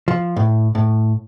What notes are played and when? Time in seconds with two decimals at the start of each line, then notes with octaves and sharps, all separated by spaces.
0.08 F3
0.36 A2
0.75 A2